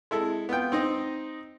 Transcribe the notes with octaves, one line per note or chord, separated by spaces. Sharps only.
G#3 E4 A4
B3 F4 G5
C4 D#4 D#5